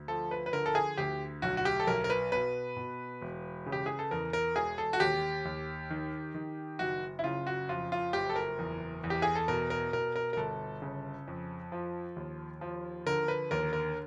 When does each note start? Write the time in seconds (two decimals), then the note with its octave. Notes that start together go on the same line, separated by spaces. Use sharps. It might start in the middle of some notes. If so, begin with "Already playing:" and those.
Already playing: D2
0.08 F3 A4
0.31 B4
0.46 B4
0.53 D3 A#4
0.66 A4
0.75 G#4
0.97 D2 G4
1.42 B1 F#4
1.57 F#4
1.65 G4
1.80 A4
1.87 B1 A#4
2.04 A#4
2.10 B4
2.32 B2 B4
2.77 B2
3.22 E1
3.66 C#3
3.72 G4
3.86 G#4
3.99 A4
4.11 E2 A#4
4.33 A#4
4.56 E1 G#4
4.78 A4
4.93 F#4
5.00 D#2 G4
5.45 D#2
5.90 D#3
6.34 D#3
6.79 F#1 F#4
7.19 E4
7.24 C#3 F4
7.47 F#4
7.69 F2 F4
7.92 F4
8.13 F#1 G4
8.30 A4
8.36 A#4
8.59 E2
9.04 E2
9.10 G4
9.22 G#4
9.35 A4
9.48 B2 A#4
9.70 A#4
9.93 B2 A#4
10.16 A#4
10.33 A#4
10.37 G1 A4
10.82 C#3
11.28 F2
11.72 F3
12.16 D#2
12.61 F3
13.06 D3 A#4
13.28 B4
13.51 D#2 A#4
13.73 A#4